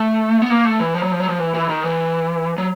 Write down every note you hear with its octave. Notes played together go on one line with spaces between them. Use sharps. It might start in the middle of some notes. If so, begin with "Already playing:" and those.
Already playing: A3
B3
A#3
A3
E3
F3
F#3
F3
F#3
F3
E3
E3
D#3
E3
F#3